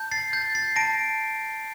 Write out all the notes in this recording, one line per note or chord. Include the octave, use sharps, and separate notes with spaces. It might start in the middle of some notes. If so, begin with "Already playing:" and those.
Already playing: A5 G6
A6 C7
G6 A6
A6 C7
A5 A#6 D7